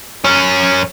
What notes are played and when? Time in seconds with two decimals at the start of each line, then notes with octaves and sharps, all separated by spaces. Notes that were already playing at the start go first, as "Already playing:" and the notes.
0.24 F#2 C#4